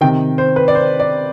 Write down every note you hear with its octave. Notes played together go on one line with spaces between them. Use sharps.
C3 D#3 G5
C5
B4
D5
C5
D5